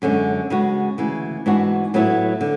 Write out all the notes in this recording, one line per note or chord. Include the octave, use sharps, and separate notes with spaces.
F#2 D3 G#3 C#4
C#3 G#3 B3 F#4
D2 C#3 E3
G#2 E3 B3 D4 F#4
A2 F#3 B3 E4
D3